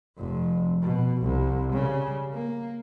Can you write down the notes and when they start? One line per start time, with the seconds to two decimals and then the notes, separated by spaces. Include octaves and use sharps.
0.18 F1 F2
0.82 B2
1.22 C2
1.73 C#3 G3
2.34 A#3